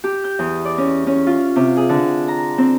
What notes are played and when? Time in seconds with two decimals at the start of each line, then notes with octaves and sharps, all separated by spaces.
0.04 G4
0.24 G6
0.39 E2
0.65 D5
0.78 C#4
1.07 C#4
1.27 F4
1.56 C3
1.77 G#4
1.89 D3
2.28 A#5
2.58 C4